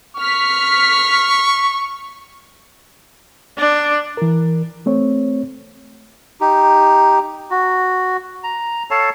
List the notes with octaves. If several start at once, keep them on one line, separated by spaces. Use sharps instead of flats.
C#6 F6 B6
D4
E3 A#4
A3 C4 C#5
D#4 G4
F#4
A#5
A4 C#5 F5 A5